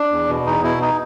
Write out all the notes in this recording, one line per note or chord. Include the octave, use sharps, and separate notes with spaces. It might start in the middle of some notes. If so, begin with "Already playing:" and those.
Already playing: D4
E2
B2
E2 D#4
B2 E4
D#4